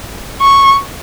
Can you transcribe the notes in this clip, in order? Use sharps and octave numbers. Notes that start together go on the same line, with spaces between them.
C#6